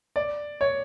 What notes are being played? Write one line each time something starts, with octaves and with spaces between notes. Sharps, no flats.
D5
C#5